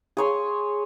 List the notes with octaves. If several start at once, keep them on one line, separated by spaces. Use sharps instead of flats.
G#4 C#5 C6